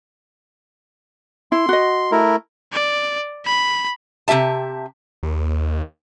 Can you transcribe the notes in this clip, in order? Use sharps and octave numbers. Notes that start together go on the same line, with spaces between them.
E4 C6
F#4 D#5
A3 E4 A#4
D5
B5
C3 C4 G4 E5 A5
D#2